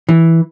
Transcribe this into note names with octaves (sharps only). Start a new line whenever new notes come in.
E3